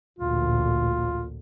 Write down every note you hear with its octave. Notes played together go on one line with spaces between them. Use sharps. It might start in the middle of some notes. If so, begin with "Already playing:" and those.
A1 D2 A#2 F4